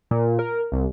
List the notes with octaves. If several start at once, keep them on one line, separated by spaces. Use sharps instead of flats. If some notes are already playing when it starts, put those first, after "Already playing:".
A#2
A#4
C2